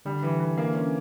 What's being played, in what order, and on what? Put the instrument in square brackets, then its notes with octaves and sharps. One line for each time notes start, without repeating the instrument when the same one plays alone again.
[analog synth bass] D3 [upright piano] G3
[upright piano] E3
E3
A#3
C#4